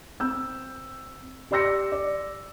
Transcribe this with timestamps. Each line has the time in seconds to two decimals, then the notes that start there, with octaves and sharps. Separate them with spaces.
0.20 C4 E6 G6
1.51 G4 D5 C6 E6 A#6 C#7
1.92 D5